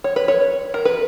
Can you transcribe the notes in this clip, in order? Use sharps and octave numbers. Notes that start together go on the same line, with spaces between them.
C#5
B4
C#5
A#4
B4